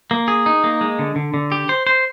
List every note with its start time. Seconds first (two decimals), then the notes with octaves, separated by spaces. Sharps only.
0.11 A#3
0.28 G#4
0.46 D#4
0.64 A#3
0.81 G#3
0.99 D3
1.16 D3
1.34 D3
1.52 G4
1.69 C5
1.87 C5